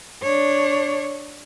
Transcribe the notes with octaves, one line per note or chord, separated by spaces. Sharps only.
D4 C#5